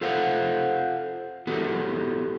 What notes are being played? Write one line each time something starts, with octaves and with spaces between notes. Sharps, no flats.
F4 A4 C5 F5 F#5
B3 E4 F#4 G4 A4